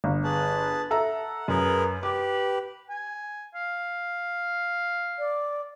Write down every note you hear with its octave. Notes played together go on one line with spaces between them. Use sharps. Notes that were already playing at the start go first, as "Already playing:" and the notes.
G1
G#4 B4 A5
A4 E5 F#5 A#5
F#2 G#4 A#4 B4
G4 B4 D6
G#5
F5
D5